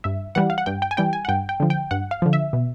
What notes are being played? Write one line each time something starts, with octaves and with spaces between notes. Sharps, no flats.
G2 E5
E3 G3 F#5
F5
F#5
G2 G5
G5
G#5
E3 G3 G5
G#5
F#5
G2 G5
G5
D3 F3
G5
G2 F#5
F5
D3 F3
E5
B2